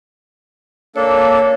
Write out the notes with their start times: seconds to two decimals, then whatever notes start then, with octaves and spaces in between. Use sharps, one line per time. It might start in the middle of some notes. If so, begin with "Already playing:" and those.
0.96 A#3 D4 A4 C#5